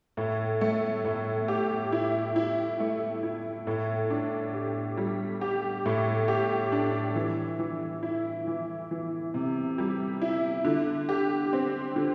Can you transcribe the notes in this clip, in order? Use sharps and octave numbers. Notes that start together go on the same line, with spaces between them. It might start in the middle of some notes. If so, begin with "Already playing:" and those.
A2
A3
A2
G4
E4
E4
A3
E4
A2
D4
G4
G3
G4
A2
G4
D4
E3
E3
E4
E3
E3
C3
G3
E4
D3
G4
C4
D3